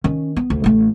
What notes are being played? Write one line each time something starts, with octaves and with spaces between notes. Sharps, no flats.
D#3 C#4
B3
D2
A1 A3